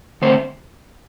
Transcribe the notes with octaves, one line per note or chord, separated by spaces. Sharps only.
D3 A3 C4 C5